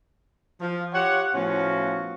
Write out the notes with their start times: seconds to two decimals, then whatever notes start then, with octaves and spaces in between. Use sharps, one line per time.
0.61 F3
0.94 F4 G4 C#5 F#5
1.34 A2 F3 B3 C#4 F4 F#4